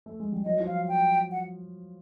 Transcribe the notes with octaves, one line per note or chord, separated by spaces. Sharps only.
A3
G#3
G3
F#3 D#5
F3
F5
G5
F#5